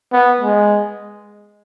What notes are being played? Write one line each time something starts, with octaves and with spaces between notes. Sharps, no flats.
B3
G#3